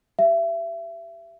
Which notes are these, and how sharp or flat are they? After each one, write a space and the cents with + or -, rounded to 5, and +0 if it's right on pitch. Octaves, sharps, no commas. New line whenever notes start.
G4 +0 E5 +30